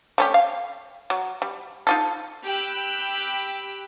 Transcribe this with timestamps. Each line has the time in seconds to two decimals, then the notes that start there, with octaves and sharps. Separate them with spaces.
0.18 A3 C#4 G4
0.34 F5
1.10 F#3
1.42 G3
1.87 D#4 F4 A4
2.44 G4 G5 B5 E6 F#6